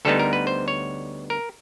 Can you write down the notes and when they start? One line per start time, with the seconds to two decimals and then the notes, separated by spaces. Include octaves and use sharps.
0.05 D2 D3 G3 B3 D#4 A4
0.19 A#4
0.33 B4
0.47 C5
0.68 C#5
1.30 A#4